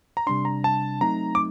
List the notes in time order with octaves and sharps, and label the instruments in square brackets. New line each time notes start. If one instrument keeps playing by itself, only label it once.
[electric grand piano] A#5
[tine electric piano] C3 G3 D4 [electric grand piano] C6
[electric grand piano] A#5
A5
[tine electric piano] F#3 A3 C4 D#4 [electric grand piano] A#5
[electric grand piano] D6